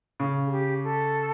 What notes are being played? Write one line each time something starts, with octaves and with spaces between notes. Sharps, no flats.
C#3
G#4
G4
A4